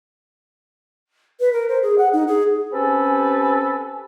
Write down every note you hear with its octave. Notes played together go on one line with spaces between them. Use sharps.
B4
A#4
C5
G#4
F#5
D#4
G#4
C4 C#4 G4 A4 B4 G#5